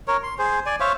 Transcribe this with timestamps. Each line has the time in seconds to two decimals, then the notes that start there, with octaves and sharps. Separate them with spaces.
0.08 A#4 C#5
0.23 C6
0.39 G#4 C5
0.66 D5 G#5
0.80 C5 C#5 E5 F5